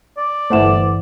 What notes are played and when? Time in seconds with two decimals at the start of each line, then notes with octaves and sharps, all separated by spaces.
0.18 D5
0.50 G1 E3 A3 C5 F#5 E7